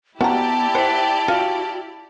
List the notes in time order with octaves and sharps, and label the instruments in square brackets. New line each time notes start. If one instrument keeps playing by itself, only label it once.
[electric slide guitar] B3 [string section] E4 G4 D5 [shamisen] F#4 A#5 [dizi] A5
[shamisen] C5 [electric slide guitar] E5 F#5
[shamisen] F4 [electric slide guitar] F#4